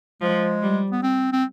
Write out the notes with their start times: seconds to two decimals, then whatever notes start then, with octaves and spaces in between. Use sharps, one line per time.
0.22 F3 G#3
0.63 G3
0.92 B3
1.03 C4
1.32 C4